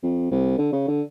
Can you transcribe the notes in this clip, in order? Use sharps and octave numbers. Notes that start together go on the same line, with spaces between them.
F2
C2
D3
C#3
D3